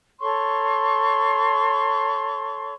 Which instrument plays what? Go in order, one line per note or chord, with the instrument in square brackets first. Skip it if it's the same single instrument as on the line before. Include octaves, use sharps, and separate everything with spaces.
[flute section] A4 C#5 C6 C#6